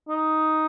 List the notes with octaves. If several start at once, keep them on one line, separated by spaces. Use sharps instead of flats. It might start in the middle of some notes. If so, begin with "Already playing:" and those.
D#4